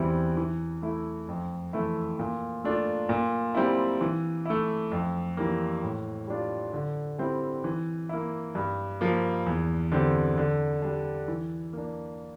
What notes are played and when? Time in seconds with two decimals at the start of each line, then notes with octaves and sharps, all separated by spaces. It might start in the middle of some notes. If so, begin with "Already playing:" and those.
Already playing: E2 E3 G3 C4 E4
0.37 E3
0.82 A3 E4
1.28 F2
1.73 E3 A3 E4
2.19 A#2
2.64 A3 D4 F4
3.09 A#2
3.55 G3 C4 E4
4.01 E3
4.45 A3 E4
4.92 F2
5.37 E3 G3 A#3
5.83 A2
6.27 G3 D4 F4
6.73 D3
7.18 G3 C4 E4
7.64 E3
8.09 A#3 E4
8.55 G2
9.01 F3 A#3
9.46 E2
9.92 D3 G3 C4
10.37 D3
10.82 G3 D4
11.28 E3
11.73 A#3 D4